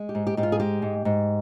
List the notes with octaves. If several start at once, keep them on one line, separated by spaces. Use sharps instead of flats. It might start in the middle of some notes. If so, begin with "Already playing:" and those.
Already playing: G#3
G4
G#2
G4
G#2 G4
F4
G#4
G#3 G4
G#2
G#2